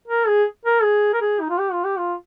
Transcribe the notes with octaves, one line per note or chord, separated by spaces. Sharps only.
A#4
G#4
A#4
G#4
A#4
G#4
D#4
F4
G4
F4
G4
F4